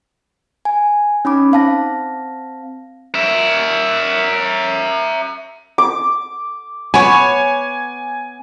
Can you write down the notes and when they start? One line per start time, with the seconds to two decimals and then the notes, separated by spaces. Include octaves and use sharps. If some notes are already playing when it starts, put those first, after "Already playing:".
0.65 G#5
1.25 C#4 D#4 B5 D6
1.52 C4 F5 A5 A#6
3.14 A#4 E5
5.78 D6
6.94 B3 C#5 G#5